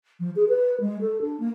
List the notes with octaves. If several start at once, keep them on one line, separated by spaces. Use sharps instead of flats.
F3
G#4
B4
G#3
A4
D4
A#3